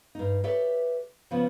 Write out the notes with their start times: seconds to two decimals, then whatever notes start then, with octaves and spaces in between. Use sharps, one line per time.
0.15 G2 D#4
0.44 G4 A4 B4 C#5 D5 E5
1.31 C#3 F3 B3